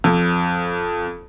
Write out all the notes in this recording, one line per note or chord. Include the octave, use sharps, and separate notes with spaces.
F2